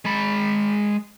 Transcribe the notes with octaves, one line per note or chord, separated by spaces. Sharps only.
G#3 B5